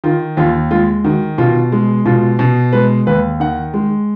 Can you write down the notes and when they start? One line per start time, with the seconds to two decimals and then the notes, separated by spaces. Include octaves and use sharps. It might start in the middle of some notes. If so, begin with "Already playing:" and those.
0.04 D#3 F4
0.37 D#2 F4
0.71 G#3 F4
1.04 D#3 F#4
1.38 B2 F4
1.72 G#3
2.06 B2 F4
2.39 B2
2.73 G#3 B4
3.07 D#2 B4
3.40 D#3 F#5
3.74 G#3